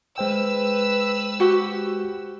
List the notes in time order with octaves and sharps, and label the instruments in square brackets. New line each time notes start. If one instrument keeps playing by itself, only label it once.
[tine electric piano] G#3 C5 G5 [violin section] B4 E6
[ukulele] F#4 G4